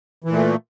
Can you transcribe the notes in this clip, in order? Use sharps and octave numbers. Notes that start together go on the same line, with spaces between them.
A#2 E3 A3